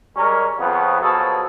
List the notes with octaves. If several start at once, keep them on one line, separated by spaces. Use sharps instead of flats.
G3 G#3 C#4 A#4
F2 C#3 B3
B2 F3 F#3 B3 G#4 A4